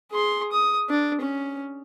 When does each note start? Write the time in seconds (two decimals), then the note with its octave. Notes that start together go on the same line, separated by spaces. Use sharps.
0.11 G#4 C6
0.52 D#6
0.90 D4
1.21 C#4